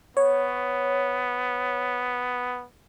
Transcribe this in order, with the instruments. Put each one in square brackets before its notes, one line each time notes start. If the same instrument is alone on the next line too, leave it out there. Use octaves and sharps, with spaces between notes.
[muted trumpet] B3 [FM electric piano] C#5